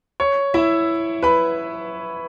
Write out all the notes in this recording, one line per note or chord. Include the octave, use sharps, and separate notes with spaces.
C#5
E4 E5
B4 B5